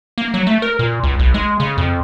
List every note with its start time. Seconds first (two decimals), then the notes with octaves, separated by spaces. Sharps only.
0.18 A#3
0.34 F#3
0.47 A3
0.62 A#4
0.79 A#2
1.03 C#2
1.19 B1
1.34 G#3
1.60 C#3
1.78 F2